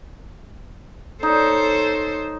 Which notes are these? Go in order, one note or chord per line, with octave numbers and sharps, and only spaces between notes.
D#4 A4 C5 C#5